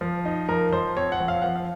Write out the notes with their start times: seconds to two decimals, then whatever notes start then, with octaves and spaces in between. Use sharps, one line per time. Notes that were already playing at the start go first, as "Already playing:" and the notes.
0.01 F3
0.25 D#4
0.49 F3 A#4
0.72 F3 C5
0.97 C4 C#5
1.12 F#5
1.20 F3
1.28 F5
1.42 F3 F#5
1.56 F5